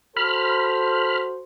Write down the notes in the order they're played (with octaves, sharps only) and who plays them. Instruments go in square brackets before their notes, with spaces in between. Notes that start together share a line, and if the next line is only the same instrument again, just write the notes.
[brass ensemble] F#4 A4 C5 [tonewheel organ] B5 F6